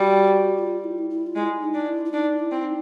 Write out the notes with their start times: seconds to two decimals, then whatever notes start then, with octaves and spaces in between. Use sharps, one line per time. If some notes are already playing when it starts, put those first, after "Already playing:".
Already playing: G3 F#4
0.58 F4
0.84 E4
0.91 F4
0.98 E4
1.10 E4
1.27 F4
1.35 G#3 E4
1.61 D#4
1.74 D4
1.87 E4
2.05 E4
2.12 D4 D#4
2.39 E4
2.51 C4
2.64 D#4